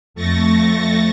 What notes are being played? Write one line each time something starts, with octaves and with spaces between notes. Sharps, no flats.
F2 A3 C#6 A6 A#6